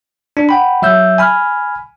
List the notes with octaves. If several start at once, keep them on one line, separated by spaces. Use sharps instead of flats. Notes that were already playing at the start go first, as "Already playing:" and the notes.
D4
F#5 G5 B5
F#3 E5 E6 G6
G#5 B5 F6